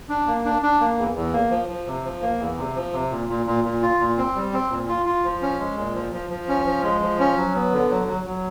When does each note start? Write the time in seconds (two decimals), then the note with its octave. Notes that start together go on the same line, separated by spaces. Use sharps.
0.09 D4
0.27 A#3
0.45 D4
0.62 D4
0.80 A#3
0.97 E2
1.15 E2
1.33 A#3
1.51 F3
1.68 F3
1.87 C3
2.05 F3
2.22 A#3
2.39 E2
2.57 C3
2.76 F3
2.93 C3
3.11 A#2
3.29 A#2
3.46 A#2
3.64 A#2
3.82 F4
4.00 A#2
4.18 C4
4.35 G3
4.53 C4
4.70 A#2
4.88 F4
5.06 F4
5.24 F3
5.42 C#4
5.59 G#3
5.77 A#2
5.95 F3
6.13 F3
6.30 F3
6.48 C#4
6.66 F3
6.83 G#3
7.02 F3
7.19 C#4
7.37 F#3
7.55 B3
7.73 D3
7.90 F#3
8.07 F#3
8.26 F#3